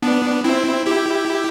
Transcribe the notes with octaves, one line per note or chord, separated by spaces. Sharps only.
B3 D4
C4 E4
E4 G4